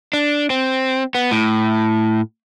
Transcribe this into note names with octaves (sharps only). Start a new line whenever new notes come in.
D4
C4
B3
A2